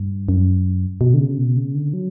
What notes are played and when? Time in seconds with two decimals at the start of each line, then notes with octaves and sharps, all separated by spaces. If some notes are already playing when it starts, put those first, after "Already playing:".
Already playing: G2
0.29 F#2
1.01 B2
1.14 D3
1.19 C#3
1.38 B2
1.57 C#3
1.75 D3
1.93 F#3